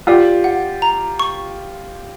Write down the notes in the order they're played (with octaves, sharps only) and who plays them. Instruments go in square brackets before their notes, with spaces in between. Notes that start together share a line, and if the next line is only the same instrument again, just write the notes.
[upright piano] F4 G4 [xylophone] D5
[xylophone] F#5
A#5
C#6